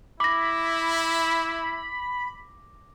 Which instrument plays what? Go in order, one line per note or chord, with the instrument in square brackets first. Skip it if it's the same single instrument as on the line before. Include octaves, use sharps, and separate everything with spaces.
[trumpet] E4 [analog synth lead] B5 [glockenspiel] D6 A#6